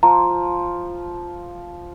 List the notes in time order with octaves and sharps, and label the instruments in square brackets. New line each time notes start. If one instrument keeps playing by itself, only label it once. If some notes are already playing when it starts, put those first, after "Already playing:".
[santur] F3 [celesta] A#5